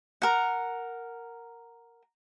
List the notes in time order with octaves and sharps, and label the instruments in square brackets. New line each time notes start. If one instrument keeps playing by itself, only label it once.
[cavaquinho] A#4 F#5